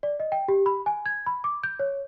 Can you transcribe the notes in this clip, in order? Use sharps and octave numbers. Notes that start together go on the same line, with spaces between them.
D5
D#5
G5
G4
B5
G#5
G#6
B5
D6
G6
C#5